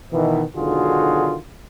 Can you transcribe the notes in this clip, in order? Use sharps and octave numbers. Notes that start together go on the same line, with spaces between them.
B2 D#3 E3
B1 D3 D#3 F4 F#4 G#4